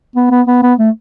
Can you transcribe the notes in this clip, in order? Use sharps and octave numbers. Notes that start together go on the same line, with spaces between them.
B3
B3
B3
B3
A3